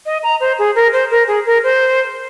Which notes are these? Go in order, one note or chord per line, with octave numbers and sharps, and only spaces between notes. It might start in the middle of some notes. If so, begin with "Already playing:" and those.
D#5
A#5
C5
G#4
A#4
C5
A#4
G#4
A#4
C5